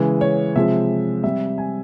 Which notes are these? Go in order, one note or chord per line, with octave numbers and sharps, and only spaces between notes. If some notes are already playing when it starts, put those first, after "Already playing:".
Already playing: C#3 E3 G#3
C#5
C3 F3 G#3 E5
C3 G3 E5
G#5